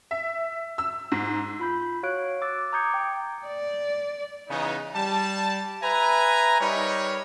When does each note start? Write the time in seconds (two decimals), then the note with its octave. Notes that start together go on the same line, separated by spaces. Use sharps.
0.11 E5
0.78 E6
1.12 G#2
1.60 F4 B5 G6
2.03 F#4 C#5 F5 F#6 D7
2.42 D6 E6 A6
2.73 A#5 D6 D#6 G6 G#6 C#7
2.94 G5
3.46 D5
4.49 C#3 E3 B3 D#4
4.94 G3 A5
5.82 B4 E5 G#5 A#5
6.60 G3 D#4 A#4 B4 C#5